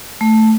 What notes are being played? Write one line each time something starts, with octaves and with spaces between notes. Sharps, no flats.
A3